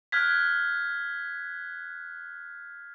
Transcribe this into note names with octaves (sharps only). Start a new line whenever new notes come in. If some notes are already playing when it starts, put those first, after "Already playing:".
F6 F#6 G#6 B6